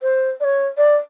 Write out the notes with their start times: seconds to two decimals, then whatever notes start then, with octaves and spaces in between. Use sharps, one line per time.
0.02 C5
0.40 D5
0.44 C#5
0.77 D5